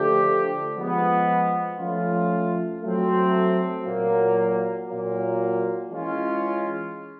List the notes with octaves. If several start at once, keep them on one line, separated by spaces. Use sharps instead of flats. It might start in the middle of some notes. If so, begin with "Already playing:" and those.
Already playing: D3 F3 A3 D4 G4
F3 G#3 B3
F3 A3 C#4 F4
F#3 A3 C4
A#2 F#3 A#3
A#2 F#3 A#3
E3 G#3 C#4 F4